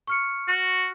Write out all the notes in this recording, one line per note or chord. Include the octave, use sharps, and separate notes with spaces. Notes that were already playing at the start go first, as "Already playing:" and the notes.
C#6 F6 C#7
F#4